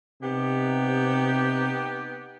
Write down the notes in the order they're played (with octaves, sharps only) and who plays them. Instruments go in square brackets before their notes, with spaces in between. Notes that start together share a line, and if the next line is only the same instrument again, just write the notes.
[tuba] C3 [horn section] B3 D#4 G4